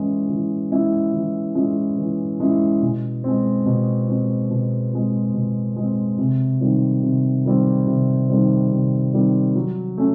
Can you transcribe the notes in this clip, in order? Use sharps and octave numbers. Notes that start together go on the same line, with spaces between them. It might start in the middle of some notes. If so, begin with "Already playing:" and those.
Already playing: E3 G#3 C#4 E4
E3
G#3 C#4 E4
E3
G#3 C#4 E4
E3
G#3 C#4 E4
B2
G#3 C4
B2
G#3 C4
B2
G#3 C4
B2
G#3 C4
C3
D#3 G3 C4
C3
D#3 G3 C4
C3
D#3 G3 C4
C3
D#3 G3 C4
F#3
A3 C#4